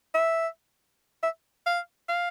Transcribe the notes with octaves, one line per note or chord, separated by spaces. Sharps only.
E5
E5
F5
F5